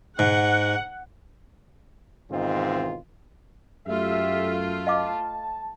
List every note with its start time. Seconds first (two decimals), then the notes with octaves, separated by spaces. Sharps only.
0.19 G#2 F#5
2.30 G#2 B2 D#3 E3 C4 F4
3.87 F#2 A3 F4 G4 E5
4.87 D#5 F5 A5 D6